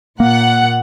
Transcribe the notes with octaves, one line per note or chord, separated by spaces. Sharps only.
A#2 A#3 F#5